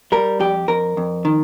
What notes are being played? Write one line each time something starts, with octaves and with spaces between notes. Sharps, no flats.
G3 A#4
F2 G4
F2 A#4
F2
D#3